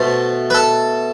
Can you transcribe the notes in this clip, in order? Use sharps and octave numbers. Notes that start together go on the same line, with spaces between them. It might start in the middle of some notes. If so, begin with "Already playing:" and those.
Already playing: B2 A3 C5
B4
A4